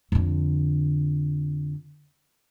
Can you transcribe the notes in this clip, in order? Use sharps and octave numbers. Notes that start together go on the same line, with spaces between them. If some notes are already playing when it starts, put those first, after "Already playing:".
F2 D3